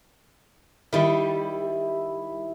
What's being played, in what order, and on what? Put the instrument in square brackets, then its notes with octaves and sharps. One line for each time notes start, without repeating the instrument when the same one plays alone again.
[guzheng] D#3 G3 [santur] E4